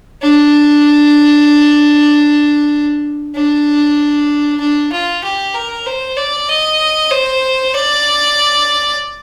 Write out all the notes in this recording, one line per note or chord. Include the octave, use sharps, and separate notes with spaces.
D4
D4
D4
F4
G4
A#4
C5
D5
D#5
C5
D5